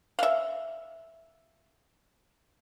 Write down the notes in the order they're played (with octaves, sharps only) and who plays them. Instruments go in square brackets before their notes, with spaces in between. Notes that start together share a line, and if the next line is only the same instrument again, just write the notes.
[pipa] E5 F5